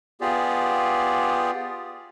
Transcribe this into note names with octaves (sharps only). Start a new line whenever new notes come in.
B3 F4 G4 G#4 D5